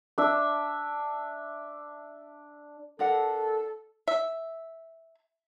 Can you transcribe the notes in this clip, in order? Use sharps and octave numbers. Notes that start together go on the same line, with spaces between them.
D4 E5
D4 A4 A#4 F#5
E5